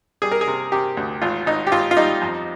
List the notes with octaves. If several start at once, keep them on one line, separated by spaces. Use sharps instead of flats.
G3 G#4
A#4
G#4
C3
C3 G4
D2
G#1 F4
G#1 D#4
G4
G#1 F4
F4
G3 D#4
F2